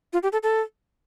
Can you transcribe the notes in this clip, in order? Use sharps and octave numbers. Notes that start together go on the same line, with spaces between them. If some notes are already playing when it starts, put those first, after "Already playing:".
F4
G4
A4
A4